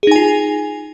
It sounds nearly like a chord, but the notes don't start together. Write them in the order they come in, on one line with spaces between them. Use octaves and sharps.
G#4 D#4 G#5 F4